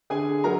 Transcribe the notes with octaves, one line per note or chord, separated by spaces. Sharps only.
D3 G#4 G#5
F#3 A#4 A#5